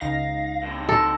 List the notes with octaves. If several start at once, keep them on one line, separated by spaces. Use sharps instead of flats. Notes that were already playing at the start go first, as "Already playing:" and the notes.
C#2 D#4 F5 A#6
G2 C3
A4